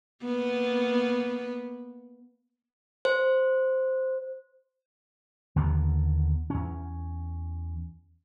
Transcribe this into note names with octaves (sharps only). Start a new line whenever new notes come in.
A#3 B3
C5
D#2 D3 A#3 B3
E2 C#4